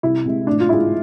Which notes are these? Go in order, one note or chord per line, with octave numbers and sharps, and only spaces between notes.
C2 E4
C3 G#3
A1 D4
F4
G#2 G#3 E4